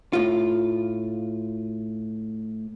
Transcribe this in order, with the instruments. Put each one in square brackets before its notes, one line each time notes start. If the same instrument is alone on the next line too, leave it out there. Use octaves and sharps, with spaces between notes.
[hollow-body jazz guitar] A2 F4